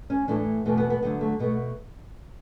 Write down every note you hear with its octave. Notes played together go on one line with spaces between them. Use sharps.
C#4
A2 E3 A3 D4
E2 B2 A3 B3
B3
B3
D2 D3 F#3 A3 B3
A3
B2 A3 B3